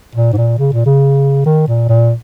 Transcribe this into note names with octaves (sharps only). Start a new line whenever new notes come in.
A#2
G#2
A#2
C#3
A#2
C#3
D#3
A#2
A#2